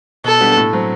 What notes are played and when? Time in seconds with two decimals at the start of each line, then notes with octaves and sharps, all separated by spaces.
0.24 B2 A4
0.40 G3 B3 D4 G4
0.57 A2
0.73 F#3 C4